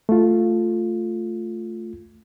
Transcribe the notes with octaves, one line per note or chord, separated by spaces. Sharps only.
A3 F4